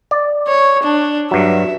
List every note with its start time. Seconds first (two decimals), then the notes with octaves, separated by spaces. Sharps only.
0.11 D5
0.48 C#5
0.83 D4
1.31 G2 F#3 E5